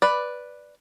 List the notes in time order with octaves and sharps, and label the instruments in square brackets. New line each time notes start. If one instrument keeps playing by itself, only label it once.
[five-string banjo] B4 D5